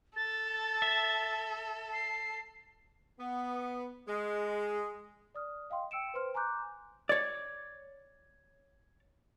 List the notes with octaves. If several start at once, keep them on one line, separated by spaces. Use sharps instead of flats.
A4 A6
E5
C7
B3
G#3
D5 D#6 F6
D#5 F5 G5 C6
G5 E6 C#7 D7 E7
B4 C5 C6 F6
G#5 A#5 C6 D6 F#6 G6
C#5 D5